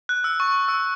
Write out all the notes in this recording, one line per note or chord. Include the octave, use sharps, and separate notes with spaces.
F#6
E6
C#6
E6